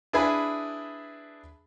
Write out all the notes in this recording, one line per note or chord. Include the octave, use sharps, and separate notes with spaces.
D4 E4 G#4 B4 G#5 B5